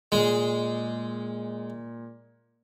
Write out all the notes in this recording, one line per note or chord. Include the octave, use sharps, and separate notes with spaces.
A#2 G#3